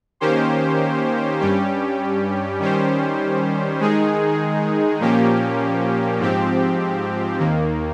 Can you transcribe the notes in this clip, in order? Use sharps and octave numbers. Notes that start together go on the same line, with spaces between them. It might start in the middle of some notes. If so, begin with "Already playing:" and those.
D#3 A#3 C#4 G4 C5
G2 G3 C#4 G4
D#3 G3 C#4 G4 C5
D#3 G#3 D#4 G#4
A#2 F3 A#3 C#4 G4
G#2 F3 C4 G4
D#2 D#3 A#3